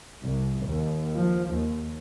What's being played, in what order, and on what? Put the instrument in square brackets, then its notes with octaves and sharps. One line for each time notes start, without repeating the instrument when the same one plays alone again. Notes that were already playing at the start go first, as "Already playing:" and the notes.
[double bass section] C2
D#2
F3
D#2